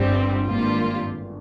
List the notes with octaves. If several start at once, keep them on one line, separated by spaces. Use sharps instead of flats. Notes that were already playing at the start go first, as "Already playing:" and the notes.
Already playing: G1 G2 G3 C4
G#1 G2 G3 A#3 F4
G1